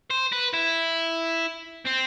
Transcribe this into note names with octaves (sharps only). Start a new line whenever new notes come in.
C5
B4
E4
C4